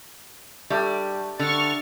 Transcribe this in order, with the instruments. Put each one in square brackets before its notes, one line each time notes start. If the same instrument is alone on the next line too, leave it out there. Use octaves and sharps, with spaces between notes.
[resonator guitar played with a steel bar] G3 [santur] A3 D4 G4
[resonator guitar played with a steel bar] D3 [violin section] C#6 F6 A6